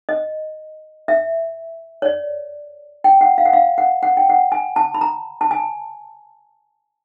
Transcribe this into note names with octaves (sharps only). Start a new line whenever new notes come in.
D#5
E5
C#5
D5
G5
F#5
F5
F#5
F5
F#5
F#5
G5
F#5
G#5
A5
B5
A#5
A5
G#5